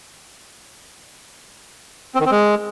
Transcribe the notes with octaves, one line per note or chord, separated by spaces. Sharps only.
C4
D#3
C4
G#3